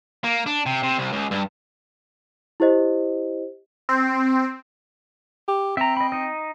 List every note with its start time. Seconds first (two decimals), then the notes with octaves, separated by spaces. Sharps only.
0.24 A#3
0.46 D4
0.66 C3
0.83 C3
0.98 C2
1.13 C#2
1.31 G2
2.60 E4 G4 C5 D#5
3.89 C4
5.48 G4
5.77 C4 E5 A#5
5.97 D#5 B5
6.12 D#4 D#5